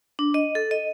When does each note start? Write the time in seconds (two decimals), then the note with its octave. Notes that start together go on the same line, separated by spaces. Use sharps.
0.19 D4
0.34 D#5
0.55 A4
0.71 D#5